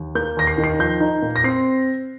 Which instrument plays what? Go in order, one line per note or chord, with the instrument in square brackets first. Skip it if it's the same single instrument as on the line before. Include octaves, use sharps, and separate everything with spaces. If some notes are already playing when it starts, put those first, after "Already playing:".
Already playing: [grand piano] D#2
A#3 G6
D#2 A#6
C7
D#3
C7
F3 G6
D#4
A#2
A#6
C4 C7